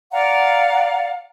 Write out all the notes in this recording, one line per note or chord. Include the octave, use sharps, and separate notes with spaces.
D5 F5 F#5 A#5